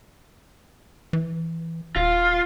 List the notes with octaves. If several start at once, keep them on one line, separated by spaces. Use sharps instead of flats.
E3
D#1 F4